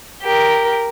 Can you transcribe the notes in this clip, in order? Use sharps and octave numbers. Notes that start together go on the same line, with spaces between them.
G4 A#4